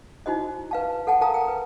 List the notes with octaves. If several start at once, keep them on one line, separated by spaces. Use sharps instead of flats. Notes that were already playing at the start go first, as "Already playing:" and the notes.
D#4 E4 F#4 C5 D#5
B4 F5 A5
A4 F#5 G5 A5
A#4 F5 A5 A#5 D#6
G5
B4